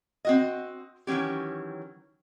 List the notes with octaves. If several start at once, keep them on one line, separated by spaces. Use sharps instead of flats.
C4 F#4 D#5
D#3 E3 F#3 C#4 G4